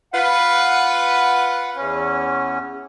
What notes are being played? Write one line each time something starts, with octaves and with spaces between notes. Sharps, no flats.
F4 B4 F#5
E2 C#4